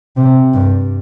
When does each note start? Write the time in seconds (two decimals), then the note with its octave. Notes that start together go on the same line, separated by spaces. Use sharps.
0.17 C3
0.53 G2